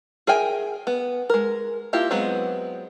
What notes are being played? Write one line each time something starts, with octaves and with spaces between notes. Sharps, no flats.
G#4 A#4 E5 G5 G#5
B3
G#3 A#4
A#3 E4 F4 G4
F#3 G#3 B3 C4